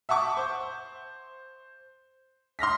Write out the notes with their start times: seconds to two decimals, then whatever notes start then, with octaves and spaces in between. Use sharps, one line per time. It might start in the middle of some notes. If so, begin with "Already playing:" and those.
0.09 E5 F#5 A5 C#6 D6
0.37 C5
2.59 C6 F6 A#6 B6